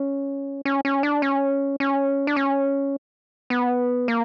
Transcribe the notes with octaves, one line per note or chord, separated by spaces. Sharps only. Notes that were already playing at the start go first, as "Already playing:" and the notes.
Already playing: C#4
C#4
C#4
D4
C#4
C#4
D4
C#4
B3
A#3